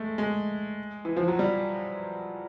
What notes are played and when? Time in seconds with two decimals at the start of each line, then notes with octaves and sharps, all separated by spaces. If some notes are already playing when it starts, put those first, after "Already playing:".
Already playing: G#3 A3
0.18 G#3
1.05 E3
1.17 F3
1.28 F#3
1.39 G3